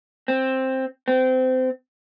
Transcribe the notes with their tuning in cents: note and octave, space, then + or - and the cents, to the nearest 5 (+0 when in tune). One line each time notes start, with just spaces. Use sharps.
C4 +10
C4 -25